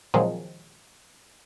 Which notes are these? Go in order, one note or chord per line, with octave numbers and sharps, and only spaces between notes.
A#2 D#3 F3 F#3 G#3 C4